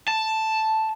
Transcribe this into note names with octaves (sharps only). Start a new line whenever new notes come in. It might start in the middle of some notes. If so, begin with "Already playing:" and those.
A5